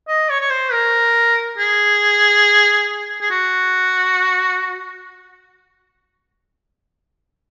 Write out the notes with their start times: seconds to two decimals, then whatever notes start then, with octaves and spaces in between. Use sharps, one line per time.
0.08 D#5
0.30 C#5
0.40 C#5
0.50 C5
0.72 A#4
1.58 G#4
3.22 G#4
3.31 F#4